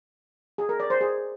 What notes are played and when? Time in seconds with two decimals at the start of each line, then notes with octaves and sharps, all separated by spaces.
0.58 G#4
0.69 A#4
0.80 D5
0.90 C5
1.01 G#4